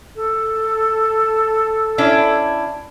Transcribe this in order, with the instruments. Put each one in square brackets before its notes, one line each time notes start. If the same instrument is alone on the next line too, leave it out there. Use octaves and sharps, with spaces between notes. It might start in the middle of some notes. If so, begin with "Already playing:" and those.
[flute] A4
[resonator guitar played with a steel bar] C#4 D4 E4